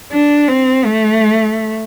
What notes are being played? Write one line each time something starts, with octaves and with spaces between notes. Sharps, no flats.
D4
C4
A3